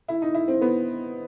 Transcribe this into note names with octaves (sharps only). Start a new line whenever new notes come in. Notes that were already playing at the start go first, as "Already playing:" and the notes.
E4
D#4
E4
C4
B3